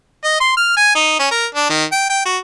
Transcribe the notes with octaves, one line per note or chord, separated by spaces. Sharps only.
D#5
C6
F6
G#5
D#4
C#4
A#4
D4
D#3
G5
G5
F#4